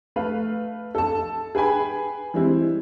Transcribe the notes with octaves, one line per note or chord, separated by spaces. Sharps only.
A3 B4 F5
A4 A5
G#4 B4 G5 G#5 B5
E3 G3 G#3 C4 E4